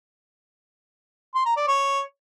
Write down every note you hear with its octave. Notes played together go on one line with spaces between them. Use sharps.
C6
A#5
D5
C#5